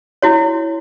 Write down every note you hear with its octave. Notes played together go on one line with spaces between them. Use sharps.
E4 F#4 C#5